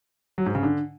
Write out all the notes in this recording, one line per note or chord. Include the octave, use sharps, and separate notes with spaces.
F#3
G#2
C#3
D3